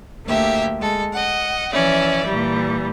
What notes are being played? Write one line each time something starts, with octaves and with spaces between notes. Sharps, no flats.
D2 A#3 G4 E5
G#3 A4
D#5 F#5
E3 F3 C#4 D5 E5
A#2 E3 G3